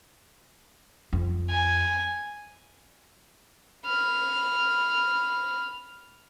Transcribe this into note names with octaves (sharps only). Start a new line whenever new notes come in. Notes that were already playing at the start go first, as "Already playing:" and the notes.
F2
G#5
B5 F6